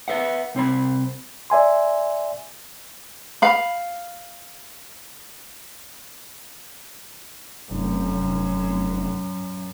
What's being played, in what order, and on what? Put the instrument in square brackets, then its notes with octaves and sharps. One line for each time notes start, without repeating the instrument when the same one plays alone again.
[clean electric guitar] B4 E5 F#5
C2 C4 C5 B5
[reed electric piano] D5 E5 G#5 C6
[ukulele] F5 B5
[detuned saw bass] F1 [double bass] F#2